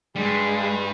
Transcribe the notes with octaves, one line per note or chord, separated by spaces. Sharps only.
G2 G3 G#3